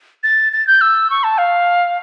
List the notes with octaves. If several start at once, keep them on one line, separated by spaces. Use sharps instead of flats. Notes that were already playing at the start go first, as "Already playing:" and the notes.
A6
A6
G6
E6
C#6
A5
F5